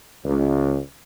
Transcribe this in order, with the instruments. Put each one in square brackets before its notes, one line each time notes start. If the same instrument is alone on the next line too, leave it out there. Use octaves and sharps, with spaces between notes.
[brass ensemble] C#2